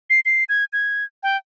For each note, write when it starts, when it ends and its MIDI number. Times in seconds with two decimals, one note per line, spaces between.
0.10 0.20 96
0.26 0.44 96
0.49 0.65 92
0.73 1.04 92
1.23 1.37 79